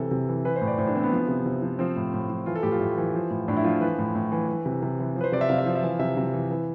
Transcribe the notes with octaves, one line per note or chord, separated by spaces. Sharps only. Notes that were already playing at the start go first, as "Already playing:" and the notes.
Already playing: C3 E3 A4
C3
E3
E3 B4
C5
A2
D5
A2 C5
D4
E3 C4
B3
F3
C3
C3
F3
F3 C4
A2
A2
F3
E3 F4
A4
A2 G4
F4
A2
E3
F3
A2
A2 D4
E4
F3 F4
E3 B4
A2
A2
E3
E3
C3
C3
E3
F3
B4
C5
C3 D5
E5
C3 F5
E5
F3
E5
E3 F5
C3 E5
C3
E3
E3